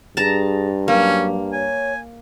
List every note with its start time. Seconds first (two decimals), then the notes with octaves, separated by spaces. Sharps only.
0.17 G2 G#4 A5 A#5
0.88 F#3 A#3 C#4
1.52 C#5 G#5